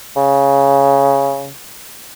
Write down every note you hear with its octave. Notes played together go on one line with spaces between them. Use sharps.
C#3